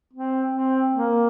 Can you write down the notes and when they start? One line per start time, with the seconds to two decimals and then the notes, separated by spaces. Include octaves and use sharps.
0.13 C4
0.52 C4
0.93 A#3